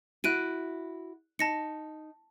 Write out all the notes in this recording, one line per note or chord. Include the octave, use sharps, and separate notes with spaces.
E4 F#4 F#6 D7 D#7
D#4 A5 A#6 C#7